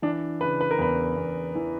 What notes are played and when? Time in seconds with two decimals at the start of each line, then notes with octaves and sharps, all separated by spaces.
0.02 E3 D4
0.41 C#3 B4
0.61 B4
0.71 A#4
0.78 E2 B4
1.17 E2
1.55 E3